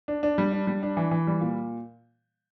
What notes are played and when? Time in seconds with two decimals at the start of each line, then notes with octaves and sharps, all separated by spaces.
0.08 D4
0.23 D4
0.38 G3
0.52 D4
0.67 G3
0.83 D4
0.97 E3
1.11 E3
1.27 G3
1.41 A#2